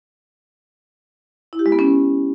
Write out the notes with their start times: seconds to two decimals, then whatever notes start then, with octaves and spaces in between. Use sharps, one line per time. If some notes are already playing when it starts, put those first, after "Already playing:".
1.53 E4
1.59 G4
1.66 G#3
1.72 B3
1.79 C#4